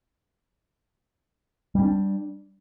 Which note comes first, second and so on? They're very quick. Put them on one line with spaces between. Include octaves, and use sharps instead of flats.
G3 C#4 D4